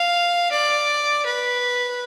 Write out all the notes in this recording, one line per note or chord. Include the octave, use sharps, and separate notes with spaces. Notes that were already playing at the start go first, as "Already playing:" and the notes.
Already playing: F5
D5
B4